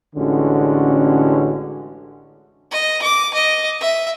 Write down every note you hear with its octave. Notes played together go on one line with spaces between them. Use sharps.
A1 D3 G#3 C#4 F#4
D#5
D6
D#5
E5